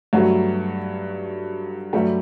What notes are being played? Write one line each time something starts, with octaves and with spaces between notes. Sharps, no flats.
G2 F#3 A3 F#4
G2 F#3 G3 A3 G4